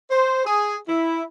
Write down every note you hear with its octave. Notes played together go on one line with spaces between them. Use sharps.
C5
G#4
E4